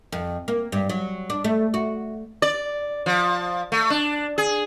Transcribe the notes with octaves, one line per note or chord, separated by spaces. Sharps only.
F2
A#3
G2
F#3
D4
A3
F#4
D5
F3
A3
D4
G#4